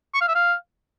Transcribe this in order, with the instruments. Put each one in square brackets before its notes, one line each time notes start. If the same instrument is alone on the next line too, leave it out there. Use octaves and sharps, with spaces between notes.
[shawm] C#6
F5
E5
F5